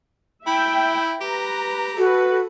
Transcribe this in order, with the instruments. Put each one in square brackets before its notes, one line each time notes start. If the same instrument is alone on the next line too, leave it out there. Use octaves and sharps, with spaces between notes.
[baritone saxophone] E4 [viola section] E5 G5
[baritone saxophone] G4 [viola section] B4 A#5
[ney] F#4 [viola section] A4 B4